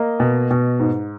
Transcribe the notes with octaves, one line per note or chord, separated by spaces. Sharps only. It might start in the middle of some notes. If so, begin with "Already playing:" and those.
Already playing: A#3 D#5
B2
B2
G#2